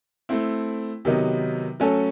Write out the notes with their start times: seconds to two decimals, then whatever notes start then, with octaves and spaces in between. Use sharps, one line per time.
0.29 A3 C4 E4
1.05 C3 D#3 F#3 B3 D#4
1.80 F#3 A3 C#4 F#4 A4